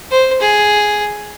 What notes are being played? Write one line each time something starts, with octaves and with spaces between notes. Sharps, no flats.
C5
G#4